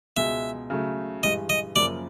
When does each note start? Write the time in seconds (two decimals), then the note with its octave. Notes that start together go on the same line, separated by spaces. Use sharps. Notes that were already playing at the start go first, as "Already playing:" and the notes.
0.17 C#2 B2 G#3 E5
0.70 C#3 F#3 A3
1.23 G2 E3 G#3 D#5
1.49 D#5
1.76 F#2 C#3 F3 A#3 D5